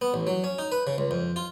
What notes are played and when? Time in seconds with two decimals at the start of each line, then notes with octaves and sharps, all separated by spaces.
0.02 B3
0.14 A1
0.27 F#3
0.44 C#4
0.59 D#4
0.72 B4
0.87 C#3
0.98 C#2
1.11 F2
1.36 F4